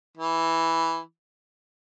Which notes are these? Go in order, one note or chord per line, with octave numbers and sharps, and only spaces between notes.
E3